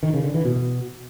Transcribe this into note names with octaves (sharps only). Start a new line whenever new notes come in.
D#3
C#3
D3
E3
B2